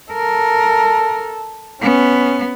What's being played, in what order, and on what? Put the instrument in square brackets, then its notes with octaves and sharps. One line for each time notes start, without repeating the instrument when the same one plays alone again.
[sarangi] A4 [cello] A#4
[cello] B3 [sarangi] C#4